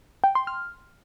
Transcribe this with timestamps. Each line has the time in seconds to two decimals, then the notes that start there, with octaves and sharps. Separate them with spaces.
0.24 G5
0.35 C6
0.47 F6